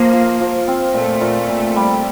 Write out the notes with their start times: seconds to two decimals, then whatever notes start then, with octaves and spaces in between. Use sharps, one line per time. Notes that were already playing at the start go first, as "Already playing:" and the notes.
Already playing: F3 A#3
0.13 F4
0.40 F3
0.68 C4
0.94 A#2 A3
1.21 A#2
1.49 A#2
1.76 G3